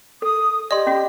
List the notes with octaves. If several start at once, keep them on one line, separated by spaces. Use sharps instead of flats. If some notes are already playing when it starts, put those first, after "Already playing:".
A4 D#6
G4 D5 D#5 C6
C#4 F#4